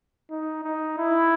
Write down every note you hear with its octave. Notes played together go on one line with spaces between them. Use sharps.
D#4
D#4
E4